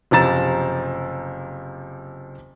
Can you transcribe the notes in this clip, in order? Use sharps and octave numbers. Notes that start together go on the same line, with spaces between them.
F#1 C3 F3 A#5 A6 E7